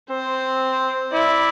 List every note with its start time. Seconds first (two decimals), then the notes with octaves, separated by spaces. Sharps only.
0.10 C4 C5
1.13 E4 D5